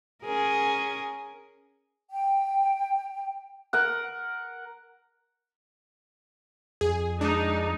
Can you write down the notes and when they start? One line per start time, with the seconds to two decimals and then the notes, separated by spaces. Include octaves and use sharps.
0.24 C#4 G#4 A#4
2.10 G5
3.73 A#4 F#5
6.81 F2 G#4
7.21 G#3 D4 D#4